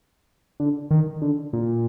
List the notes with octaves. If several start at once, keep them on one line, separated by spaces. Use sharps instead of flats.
D3
D#3
D3
A#2